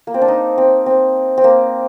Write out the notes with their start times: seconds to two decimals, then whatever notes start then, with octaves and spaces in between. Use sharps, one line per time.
0.07 A#3
0.14 C4
0.21 D4
0.28 D#4
0.58 C4
0.86 C4
1.37 C4
1.44 A#3